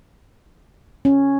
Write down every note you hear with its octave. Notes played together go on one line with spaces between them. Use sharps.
C#4